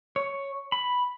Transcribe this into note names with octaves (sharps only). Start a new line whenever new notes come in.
C#5
B5